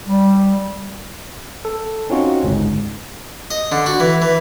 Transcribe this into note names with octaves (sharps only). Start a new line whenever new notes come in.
G3
A4
C4 C#4 D#4 F4 F#4
G1 C#2 G#2
D#5
D3
F#4
E3
E3